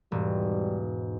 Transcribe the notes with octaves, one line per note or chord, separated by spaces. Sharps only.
E1 G#2 G3